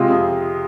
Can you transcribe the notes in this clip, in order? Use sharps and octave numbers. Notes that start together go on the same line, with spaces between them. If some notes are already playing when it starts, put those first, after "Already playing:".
Already playing: C3 G#3 F4
F2